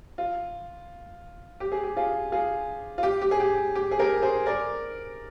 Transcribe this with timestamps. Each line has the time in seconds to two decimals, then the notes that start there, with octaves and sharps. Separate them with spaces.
0.18 F4
1.60 G4
1.72 G#4
1.83 G4
1.97 F4 G#4
2.32 F4 G#4
2.98 F4
3.03 G4
3.22 G4
3.31 G#4
3.40 G4
3.75 G4
3.91 G#4
3.99 G4 A#4
4.22 G#4 C5
4.46 A#4 D5